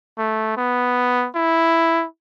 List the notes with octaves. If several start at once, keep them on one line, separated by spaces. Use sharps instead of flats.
A3
B3
E4